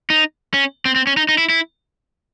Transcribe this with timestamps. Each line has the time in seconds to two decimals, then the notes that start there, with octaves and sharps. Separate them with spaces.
0.10 D#4
0.54 C#4
0.85 C4
0.96 C4
1.07 C#4
1.17 D#4
1.29 D#4
1.38 E4
1.49 E4